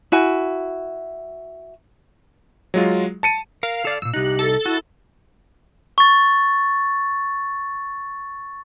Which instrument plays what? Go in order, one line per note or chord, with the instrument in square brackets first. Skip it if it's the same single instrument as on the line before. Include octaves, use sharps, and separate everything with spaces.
[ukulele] E4 F#4 G#5
[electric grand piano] F#3 G#3 F4
A5 C#7 D#7
[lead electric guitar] A#4 [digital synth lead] F5
[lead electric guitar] A4 D5
[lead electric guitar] F2 A#2 [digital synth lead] E6
[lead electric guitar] C2 D#4 [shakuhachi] G4 [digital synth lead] F#6
[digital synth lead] A4
[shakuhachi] E4 [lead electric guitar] F#4
[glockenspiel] C#6 A6